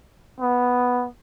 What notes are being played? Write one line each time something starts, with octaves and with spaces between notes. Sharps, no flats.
B3